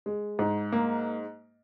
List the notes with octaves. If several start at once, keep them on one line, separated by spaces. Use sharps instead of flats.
G#3
G#2
A#3